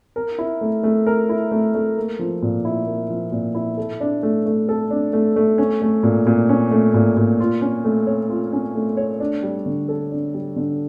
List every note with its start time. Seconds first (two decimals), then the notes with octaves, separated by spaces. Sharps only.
0.16 A#4
0.38 E4
0.61 A3
0.83 A3
1.07 A#4
1.29 E4
1.52 A3
1.75 A3
1.97 A#3
2.19 F3
2.42 A#2
2.65 E4
2.87 A#3
3.10 F3
3.32 A#2
3.55 E4
3.77 A4
4.00 D4
4.23 A3
4.46 A3
4.69 A4
4.90 D4
5.13 A3
5.36 A3
5.58 C#4
5.82 A3
6.03 A#2
6.27 A#2
6.49 C#4
6.71 A3
6.94 A#2
7.17 A#2
7.40 F4
7.61 C#4
7.84 A3
8.07 C#5
8.30 F4
8.53 C#4
8.75 A3
8.97 C#5
9.20 D4
9.43 G3
9.66 D3
9.89 A4
10.11 D4
10.34 G3
10.56 D3